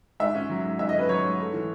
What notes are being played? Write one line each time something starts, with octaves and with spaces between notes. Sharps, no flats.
G#2 E5
C#4
F#3
G#2
G#2 E5
D#5
C#4 B4
F#3 C#5
G#2
A3
E3